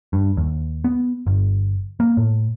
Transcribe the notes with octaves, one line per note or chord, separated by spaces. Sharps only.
G2
D#2
B3
G1
A#3
A2